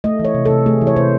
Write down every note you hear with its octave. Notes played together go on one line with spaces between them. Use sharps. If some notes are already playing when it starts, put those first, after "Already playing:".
A3 D#5
E3
C#5
C3
A4
C3
A3 G#4
E3
C#5
C3 C5